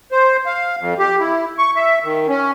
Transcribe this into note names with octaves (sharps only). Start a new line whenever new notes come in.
C5
F5
F2
G4
E4
C#6
E5
D#3
C#4